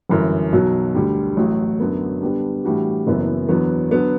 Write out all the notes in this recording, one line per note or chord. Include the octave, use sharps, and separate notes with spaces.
G1 F#2 E3
B1 B2 F#3
D2 D3 G3
A1 A2 F#3
F#2 D3 F#3 B3
D3 G3 B3 D4
A2 E3 G3 D4 F#4
F#1 F#2 E3 B3
E2 D3 F#3 B3
D3 F#3 B3